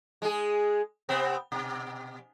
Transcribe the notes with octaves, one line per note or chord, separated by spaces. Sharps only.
G#3 G#4
C3 B3 C4
B2